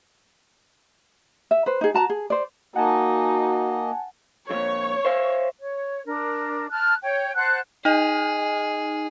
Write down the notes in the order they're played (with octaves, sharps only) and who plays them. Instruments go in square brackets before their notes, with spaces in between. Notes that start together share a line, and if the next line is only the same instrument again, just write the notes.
[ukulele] E5
B4 C5
D#4 G#4
F#4 A5 A#5
G#4
C5 D5
[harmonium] A#3 D#5 [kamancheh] D#4 [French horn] F#4 [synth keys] F#5 G#5 A5
[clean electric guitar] F2 A#2 [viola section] C#5
[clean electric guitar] C5 E5 F5
[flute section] C#5
D4 A#4
A5 F6 F#6
C#5 G5
C5 F#5 A5 F#6
[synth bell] D#4 D#5 [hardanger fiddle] G#4